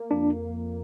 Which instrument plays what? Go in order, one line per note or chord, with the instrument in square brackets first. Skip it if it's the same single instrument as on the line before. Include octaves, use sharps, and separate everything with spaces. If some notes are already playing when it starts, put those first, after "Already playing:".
Already playing: [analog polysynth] A#3
[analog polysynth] F2 [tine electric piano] D4